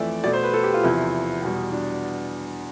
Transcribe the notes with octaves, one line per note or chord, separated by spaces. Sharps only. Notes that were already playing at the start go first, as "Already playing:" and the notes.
Already playing: F2 E3 A3 D5 E5
B2 A3 D5
C5
B4
A4
G4
F4
E2 C3 F3 E4
E2 B2 G3
D4